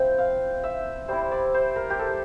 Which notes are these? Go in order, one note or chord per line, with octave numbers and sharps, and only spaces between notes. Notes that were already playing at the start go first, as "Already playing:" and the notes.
Already playing: F3 C4 E4 G5
F5
E5
G3 C4 E4 C5
D5
C5
A#4
G4
A4